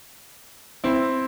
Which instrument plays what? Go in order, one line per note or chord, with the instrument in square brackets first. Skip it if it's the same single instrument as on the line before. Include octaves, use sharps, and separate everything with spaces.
[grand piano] C4 E4